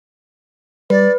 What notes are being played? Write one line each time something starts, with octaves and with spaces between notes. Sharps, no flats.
G3 B4 D5